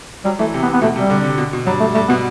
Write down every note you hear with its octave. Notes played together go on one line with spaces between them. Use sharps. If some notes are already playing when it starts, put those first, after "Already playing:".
F#3 G3
E3 A3
C3
B3
B3
B2 A3
C3 G3
D3
C3
B2
B2
G2 F#3
A3
G2 A3
B2 B3